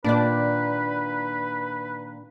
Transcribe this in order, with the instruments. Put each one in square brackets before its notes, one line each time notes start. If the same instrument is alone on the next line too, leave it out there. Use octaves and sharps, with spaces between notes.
[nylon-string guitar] A#2 D#3 D5 [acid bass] D4 [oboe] B4